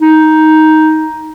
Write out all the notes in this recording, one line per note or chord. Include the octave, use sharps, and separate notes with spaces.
D#4